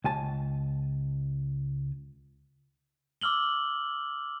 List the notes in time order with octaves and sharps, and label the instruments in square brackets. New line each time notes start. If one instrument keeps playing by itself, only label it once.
[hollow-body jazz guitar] C#2 G#5 A5
[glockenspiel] D6 E6 F6 F#7 G7